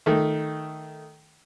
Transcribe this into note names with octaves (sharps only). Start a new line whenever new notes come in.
D#3 A3